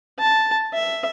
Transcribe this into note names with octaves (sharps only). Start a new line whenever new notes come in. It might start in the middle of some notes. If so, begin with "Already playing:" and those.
A5
E5